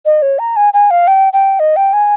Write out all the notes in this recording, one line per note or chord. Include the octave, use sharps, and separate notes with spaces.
D#5
C#5
A#5
G#5
G#5
F5
G5
G5
D#5
G5
G#5